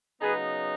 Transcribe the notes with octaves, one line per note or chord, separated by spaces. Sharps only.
C#3 F#3 B3 D#4 G#4 B4